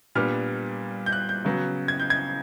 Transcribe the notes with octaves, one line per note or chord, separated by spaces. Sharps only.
A#2 G3 B3 D4 F6
G6
F#6
G6
C#3 F#3 B3
G#6
G6
G#6